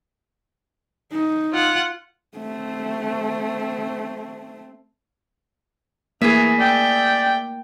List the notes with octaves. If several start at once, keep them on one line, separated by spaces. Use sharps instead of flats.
D#4
F4 F#5
A3 C4
E3 A3 A#3 G#4 A#4 E5
D5 G5